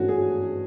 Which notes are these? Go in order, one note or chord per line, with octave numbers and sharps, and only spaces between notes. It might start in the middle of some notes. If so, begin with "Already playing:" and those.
Already playing: G#1 G2 E3 A3 C#4 F#4
G#4